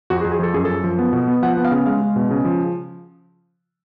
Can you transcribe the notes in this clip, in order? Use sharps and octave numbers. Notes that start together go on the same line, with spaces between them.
F2 F#4
G#4
F2
G#4
F3 A4
F#2 G#4
F#2 A4
F3
B3
B2
B3
F3 F#5
B3
F5
C#3
G#3 F5
G#3
B2
C#3
F3